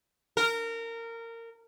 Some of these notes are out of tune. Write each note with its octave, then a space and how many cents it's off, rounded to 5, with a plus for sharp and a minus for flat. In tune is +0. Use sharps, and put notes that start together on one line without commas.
A#4 -20